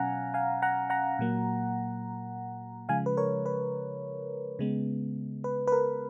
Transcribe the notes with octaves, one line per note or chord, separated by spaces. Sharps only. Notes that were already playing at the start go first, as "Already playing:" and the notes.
Already playing: B2 F#3 C#4 F5 F#5 G#5 A#5
F5 G#5
F#5 A#5
F#5 A#5
A#2 F#3 A#3
C#3 F3 G#3 F5 G#5
B4
A#4 C#5
B4
C#3 G#3 B3
B4
B4
A#4